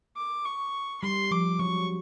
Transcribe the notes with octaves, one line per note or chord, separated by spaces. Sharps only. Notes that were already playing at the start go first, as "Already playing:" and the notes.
D6
C#6
G3 C6
F3 D6
F#3 C#6